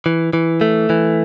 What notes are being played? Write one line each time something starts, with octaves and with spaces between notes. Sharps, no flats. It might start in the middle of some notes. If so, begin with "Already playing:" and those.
E3
E3
A3
E3